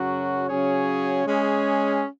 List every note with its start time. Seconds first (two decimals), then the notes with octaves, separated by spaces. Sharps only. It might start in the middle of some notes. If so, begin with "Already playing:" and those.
Already playing: F#2 C#3 F#3 C#4 F#4
0.48 C#3 F#3 C#4 G#4 C#5
1.27 G#3 C#4 G#4